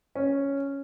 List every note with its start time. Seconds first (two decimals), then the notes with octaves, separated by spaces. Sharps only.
0.15 C#4